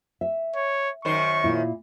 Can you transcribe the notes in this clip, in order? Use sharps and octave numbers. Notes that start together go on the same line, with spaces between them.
E5
C#5
F#2 D#3 C5 C#6
A#2 E4